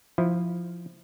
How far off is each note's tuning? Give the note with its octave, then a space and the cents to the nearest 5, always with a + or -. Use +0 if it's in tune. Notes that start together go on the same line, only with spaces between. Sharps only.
F3 +0 E4 -10